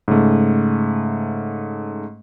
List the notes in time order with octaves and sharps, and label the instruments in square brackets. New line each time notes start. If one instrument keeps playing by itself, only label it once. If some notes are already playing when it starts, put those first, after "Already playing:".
[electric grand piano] G#2 C#3 A3